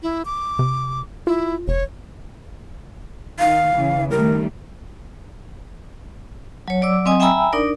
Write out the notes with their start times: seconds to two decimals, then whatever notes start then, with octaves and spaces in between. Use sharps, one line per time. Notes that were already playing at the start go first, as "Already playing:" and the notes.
0.03 E4
0.25 D6
0.59 C3
1.27 E4 F4
1.68 F1 C#5
3.40 D#3 F5
3.74 C#3 E3
4.11 D#3 G3 A3 A#4
6.68 F#3 C#5
6.81 F#3 D5 D6 E6
7.05 F#3 C4 D#5 G#5 D#6
7.20 E5 G5 G#5 A#5 B5 E6
7.53 D4 D#4 A#4 D5